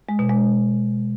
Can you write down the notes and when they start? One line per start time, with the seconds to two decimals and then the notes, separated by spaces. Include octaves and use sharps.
0.09 G#3
0.19 B2
0.30 G#3